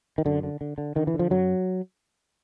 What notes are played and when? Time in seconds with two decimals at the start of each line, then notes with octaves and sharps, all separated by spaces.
0.18 D#3
0.25 F#2 D3
0.43 D3
0.61 D3
0.78 D3
0.96 D3 D#3
1.07 E3
1.14 D3
1.19 F3
1.30 F#2 F#3